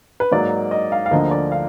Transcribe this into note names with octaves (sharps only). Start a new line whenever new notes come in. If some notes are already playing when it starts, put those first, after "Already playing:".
B4
G#2 F#3 A#3 D5
D#5
F5
F5
D2 D3 F3 A#3 D#5
D5
F5